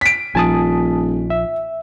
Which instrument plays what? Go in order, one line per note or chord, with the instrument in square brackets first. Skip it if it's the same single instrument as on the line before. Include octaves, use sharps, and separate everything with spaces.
[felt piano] B6 D7
[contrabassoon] D#1 [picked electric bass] A#1 F3 [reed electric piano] G#5 A5 D#6
[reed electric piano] E5